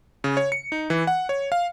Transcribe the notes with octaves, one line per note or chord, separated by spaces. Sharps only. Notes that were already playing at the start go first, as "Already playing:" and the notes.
C#3
C#5
C#7
D#4
E3
F#5
C#5
F5